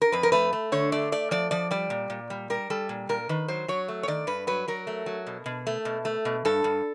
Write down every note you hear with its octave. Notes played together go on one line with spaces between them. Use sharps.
A#4
F2 B4
A#4
A3 B4
A3
D3 C#5
A3 D5
A3 D5
F3 D5
F3 D5
G3 D5
A#2
A#2
G3
G3 A#4
G3 A4
A#2
A#2 A#4
D#3 B4
F#3 C5
F#3 C#5
A3
C#5
D#3 D5
G2 B4
F#3 B4
F#3 A#4
A3
F#3
B2
B2
A3
B2
A3
B2
G2 A4
G2